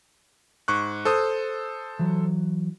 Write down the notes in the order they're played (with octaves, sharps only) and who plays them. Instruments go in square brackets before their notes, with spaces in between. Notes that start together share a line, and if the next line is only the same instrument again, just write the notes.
[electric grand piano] G#2 C#6 F#6
A4 C5 D#6
[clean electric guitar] E3 F#3